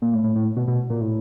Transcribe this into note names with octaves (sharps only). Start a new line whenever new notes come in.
A#2
A2
A2
A2
B2
B2
A#2
A2